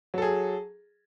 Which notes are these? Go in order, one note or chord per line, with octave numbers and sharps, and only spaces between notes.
F#3 G#4 A4